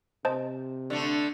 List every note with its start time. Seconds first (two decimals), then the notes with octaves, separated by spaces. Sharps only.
0.25 C3 C5 D#5 A5
0.90 D3 A3